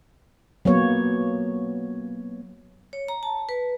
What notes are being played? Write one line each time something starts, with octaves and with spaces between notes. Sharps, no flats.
F#3 A#3 B3 C#5
C#5
A#5
A5
B4